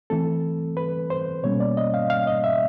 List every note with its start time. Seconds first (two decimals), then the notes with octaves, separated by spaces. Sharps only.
0.10 E3 A3 C4 A4
0.77 B4
1.10 C5
1.44 B2 G3 A#3 C#4 C#5
1.60 D5
1.77 D#5
1.94 F5
2.10 F5
2.27 D#5
2.44 E5